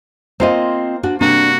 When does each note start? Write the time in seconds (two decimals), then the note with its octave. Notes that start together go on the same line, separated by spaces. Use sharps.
0.40 A#3 C4 F4 C5 D#5
1.03 D4 F#4
1.21 G2 C3 A#3 D4 F#4